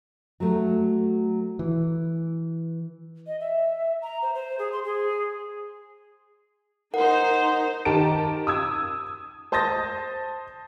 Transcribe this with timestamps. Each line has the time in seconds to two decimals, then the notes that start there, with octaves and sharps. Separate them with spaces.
0.40 F#3 A3
1.59 E3
3.27 D#5
3.40 E5
4.02 A#5
4.22 C5
4.34 C5
4.59 G#4
4.72 C6
4.84 G#4
6.94 D#4 A#4 C5 F#5
7.85 D#3 G4 A5 A#5 D7
8.47 D#6 E6 G#6
9.52 C5 A5 D#6 G6 A6 A#6